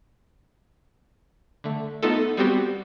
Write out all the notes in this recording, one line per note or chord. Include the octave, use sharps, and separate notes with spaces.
D3 A3
A3 B3 D#4 F4 A4
G3 B3 C4 F#4 G4